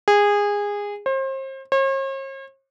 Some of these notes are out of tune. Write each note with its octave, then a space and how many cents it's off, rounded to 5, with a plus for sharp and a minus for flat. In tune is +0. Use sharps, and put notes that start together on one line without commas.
G#4 -20
C5 +35
C#5 -45